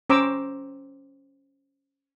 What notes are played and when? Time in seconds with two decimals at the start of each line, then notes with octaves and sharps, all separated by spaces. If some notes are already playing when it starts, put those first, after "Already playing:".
0.10 C#4 C5 A#5 D6 E6